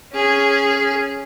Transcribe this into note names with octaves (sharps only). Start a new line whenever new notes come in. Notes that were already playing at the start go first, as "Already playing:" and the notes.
C#4 G#4